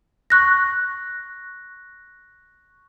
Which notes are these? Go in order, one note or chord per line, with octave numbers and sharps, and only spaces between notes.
C#6 F#6 A#6